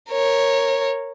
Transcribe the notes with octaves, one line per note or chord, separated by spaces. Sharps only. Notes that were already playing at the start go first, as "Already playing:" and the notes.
A#4 C#5